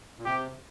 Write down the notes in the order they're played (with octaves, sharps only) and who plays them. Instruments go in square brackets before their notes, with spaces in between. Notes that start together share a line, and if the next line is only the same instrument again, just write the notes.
[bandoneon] A#2
[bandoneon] C3 [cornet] G4